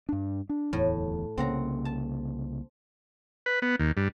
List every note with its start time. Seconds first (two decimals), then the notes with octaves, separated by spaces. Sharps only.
0.09 G2 D4
0.49 D4
0.73 D1 E2 A2
1.38 C2 C#3 A#3 C4 F#5 A#5
1.85 A5
3.46 B4
3.62 B3
3.80 D#2
3.97 G2